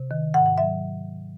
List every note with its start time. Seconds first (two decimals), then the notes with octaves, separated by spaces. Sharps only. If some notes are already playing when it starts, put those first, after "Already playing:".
Already playing: C3
0.11 D#3
0.34 G#2 F#5
0.46 F#5
0.58 F#3 E5